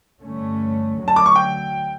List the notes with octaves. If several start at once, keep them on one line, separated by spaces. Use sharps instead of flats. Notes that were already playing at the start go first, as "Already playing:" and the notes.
G2 D3 A3 C#4
D2 D3 F#3
A5
D6
C#6
G5